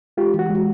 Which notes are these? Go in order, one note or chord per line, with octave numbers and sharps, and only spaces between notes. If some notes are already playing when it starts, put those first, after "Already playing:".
G#3 F4 G4
E3 F#4
G#3